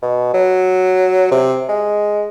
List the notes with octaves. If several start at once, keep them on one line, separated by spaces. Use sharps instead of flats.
B2
F#3
C3
G#3